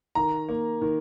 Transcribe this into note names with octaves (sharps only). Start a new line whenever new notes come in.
D#3 A#5
A#3
D#3